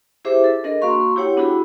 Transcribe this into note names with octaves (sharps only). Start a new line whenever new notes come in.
E4 G4 G#4 C5 E5 D6
A4
D4 G#4 A#4 D#5
A#3 F#4 F5 C6 C#6
E4 G4 C#5 F#5 G5
B3 D4 E4 F#4 G#4